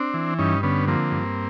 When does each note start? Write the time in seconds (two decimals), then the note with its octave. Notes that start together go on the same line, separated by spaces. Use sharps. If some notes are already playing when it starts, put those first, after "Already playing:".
Already playing: C4 D4
0.14 E3
0.39 G2 C#4 D#4
0.63 D3 B3 C#4
0.88 F3 A#3 C4
1.12 G2